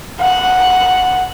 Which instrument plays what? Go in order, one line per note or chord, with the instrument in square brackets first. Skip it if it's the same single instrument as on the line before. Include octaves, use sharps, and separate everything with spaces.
[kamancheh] F#5